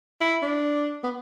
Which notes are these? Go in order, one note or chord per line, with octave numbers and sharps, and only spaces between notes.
E4
D4
B3